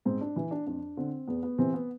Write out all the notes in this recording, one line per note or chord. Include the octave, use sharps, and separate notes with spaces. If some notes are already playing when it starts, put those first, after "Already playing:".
G#2 C4
D4
E3 E4
D4
F2 D4
D3 C4
E2 B3
B3
C3 E3 C4
B3